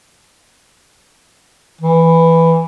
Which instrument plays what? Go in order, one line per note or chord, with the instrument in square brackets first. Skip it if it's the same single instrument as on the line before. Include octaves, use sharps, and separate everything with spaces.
[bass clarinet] E3